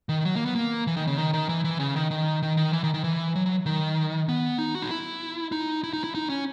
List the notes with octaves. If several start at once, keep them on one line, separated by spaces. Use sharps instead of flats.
D#3
F#3
A#3
B3
A#3
E3
D#3
C#3
D#3
D#3
E3
E3
C#3
D#3
D#3
D#3
D#3
E3
D#3
D#3
E3
F#3
F#3
D#3
B3
D#4
F#4
D#4
E4
D#4
E4
D#4
E4
D#4
C#4